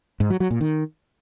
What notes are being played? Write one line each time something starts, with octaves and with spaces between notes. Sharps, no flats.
G#2
F#3
F#3
A#2
D#3